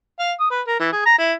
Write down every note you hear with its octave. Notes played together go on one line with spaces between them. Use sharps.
F5
D#6
B4
A#4
E3
G#4
A#5
E4